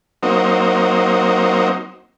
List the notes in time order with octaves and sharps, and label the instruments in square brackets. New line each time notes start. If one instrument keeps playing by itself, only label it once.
[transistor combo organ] F#3 A#3 C4 D#4